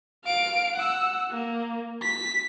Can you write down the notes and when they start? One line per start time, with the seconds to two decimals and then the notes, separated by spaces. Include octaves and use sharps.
0.25 F5 D7
0.76 F#5 E6
1.31 A#3
2.02 B6